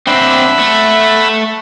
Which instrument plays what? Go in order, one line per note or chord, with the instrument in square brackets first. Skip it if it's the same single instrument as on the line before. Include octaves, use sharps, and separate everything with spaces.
[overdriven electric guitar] C4 D4 [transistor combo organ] E5 F#5 B5
[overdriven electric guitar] A3